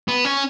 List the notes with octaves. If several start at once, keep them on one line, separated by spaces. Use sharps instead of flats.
B3
C#4